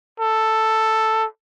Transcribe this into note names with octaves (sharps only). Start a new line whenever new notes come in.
A4